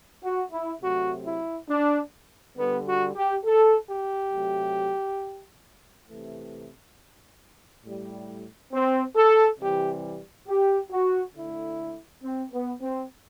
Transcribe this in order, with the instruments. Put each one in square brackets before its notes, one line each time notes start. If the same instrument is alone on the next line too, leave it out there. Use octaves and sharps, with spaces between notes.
[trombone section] F#4
E4
C3 F#3 A3 F#4
E4
D4
D3 G3 B3
F#4
G4
A4
G4
C3 F#3 A3
C3 E3 A3
A2 G3
C4
A4
C3 E3 G3 G4
G4
F#4
D3 A3 E4
C4
B3
C4